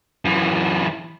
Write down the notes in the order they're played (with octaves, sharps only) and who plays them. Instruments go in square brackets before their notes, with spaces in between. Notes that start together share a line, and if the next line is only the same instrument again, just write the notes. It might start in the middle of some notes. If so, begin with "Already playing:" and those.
[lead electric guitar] F#2 E3